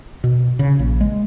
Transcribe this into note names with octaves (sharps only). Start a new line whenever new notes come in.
B2
C#3
A#1
G#3